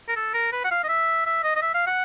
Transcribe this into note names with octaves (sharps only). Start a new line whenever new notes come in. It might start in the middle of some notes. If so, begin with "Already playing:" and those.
A#4
A4
A#4
B4
F#5
F5
D#5
E5
E5
D#5
D#5
E5
F5
F#5